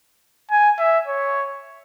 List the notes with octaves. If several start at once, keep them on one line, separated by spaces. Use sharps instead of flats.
G#5
E5
C#5